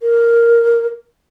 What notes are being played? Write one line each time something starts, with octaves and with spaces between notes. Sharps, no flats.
A#4